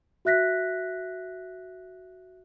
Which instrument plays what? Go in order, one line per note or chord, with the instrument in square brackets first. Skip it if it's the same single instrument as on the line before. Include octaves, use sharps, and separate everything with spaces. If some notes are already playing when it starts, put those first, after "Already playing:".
[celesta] F#4 E5 F#6 A#6 B6